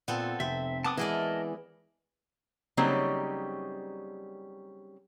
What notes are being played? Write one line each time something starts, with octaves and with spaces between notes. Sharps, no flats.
A#2 B3 C4 A4
F1 C4 E5
B3 A5 D6 D#6
E3 G#3 E4 G#4 A#4 D5 D#5 A5
C#3 F#3 G3 A#3 C4 D#4